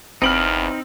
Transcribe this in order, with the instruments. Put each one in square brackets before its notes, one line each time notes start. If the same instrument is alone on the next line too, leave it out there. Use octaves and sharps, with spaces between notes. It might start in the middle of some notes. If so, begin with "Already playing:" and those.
[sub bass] G1 [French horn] E2 [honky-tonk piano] C4 D7 F#7 [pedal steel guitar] D#4 B5 F6